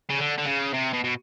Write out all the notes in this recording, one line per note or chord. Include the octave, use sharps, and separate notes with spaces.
C#3
D3
D3
C#3
C3
B2
B2